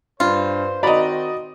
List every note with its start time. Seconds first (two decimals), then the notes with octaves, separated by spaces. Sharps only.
0.20 G2 F4 B4 C5
0.83 D#3 C4 F#4 D5 D#5 A#5 B5